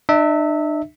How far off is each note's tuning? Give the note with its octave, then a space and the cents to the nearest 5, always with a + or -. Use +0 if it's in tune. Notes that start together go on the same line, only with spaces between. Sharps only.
D4 +45 E5 -20